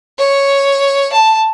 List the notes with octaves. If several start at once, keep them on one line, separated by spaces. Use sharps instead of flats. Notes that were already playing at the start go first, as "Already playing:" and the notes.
C#5
A5